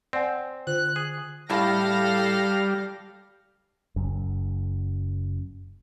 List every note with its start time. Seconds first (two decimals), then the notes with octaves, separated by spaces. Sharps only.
0.13 C4 D5 F#5 G#5
0.67 D3 F4 C5 F#6
0.96 G#4
1.50 A2 G3 E4 A4 F5 A5 F6 A#6
3.96 F#1 F#2